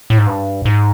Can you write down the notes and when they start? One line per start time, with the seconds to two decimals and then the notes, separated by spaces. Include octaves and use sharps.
0.10 A2
0.18 G#2
0.27 G2
0.65 G#2